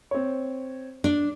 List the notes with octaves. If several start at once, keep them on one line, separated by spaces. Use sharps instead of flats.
C4 C#5
D4